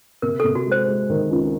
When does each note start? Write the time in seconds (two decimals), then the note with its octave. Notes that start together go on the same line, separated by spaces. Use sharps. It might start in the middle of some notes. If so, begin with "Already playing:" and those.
0.22 C3 A#4
0.40 C3 A4
0.55 F#4
0.66 G#3
0.72 C5
0.88 G#3
1.10 D#3
1.31 C#2